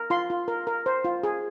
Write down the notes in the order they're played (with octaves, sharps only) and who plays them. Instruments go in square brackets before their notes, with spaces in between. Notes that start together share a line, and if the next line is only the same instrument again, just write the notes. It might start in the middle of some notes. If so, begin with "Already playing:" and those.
Already playing: [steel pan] A#4
F4 C6
F4
A#4
A#4
C5
F4
G#4